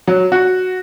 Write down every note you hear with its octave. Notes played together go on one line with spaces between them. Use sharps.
F#3
F#4